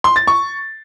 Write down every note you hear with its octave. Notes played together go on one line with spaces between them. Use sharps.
C6
A6
C#6